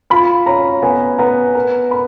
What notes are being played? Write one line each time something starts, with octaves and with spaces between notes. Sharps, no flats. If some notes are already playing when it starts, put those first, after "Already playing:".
F4 B5
C#4 A#5
B3 G#5
B3 A#5
A#4 A#5
A#4 B5